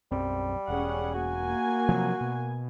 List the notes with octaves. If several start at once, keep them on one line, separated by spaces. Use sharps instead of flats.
B1 F#2 G3 C4
E1 C#4 G#4 F#5
A#3 F#4 G#5
C3 F3 F#3
B2